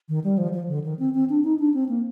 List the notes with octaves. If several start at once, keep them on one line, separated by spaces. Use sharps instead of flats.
D#3
G3
F3
F3
D3
D#3
C4
C4
D4
D#4
D4
C4
A#3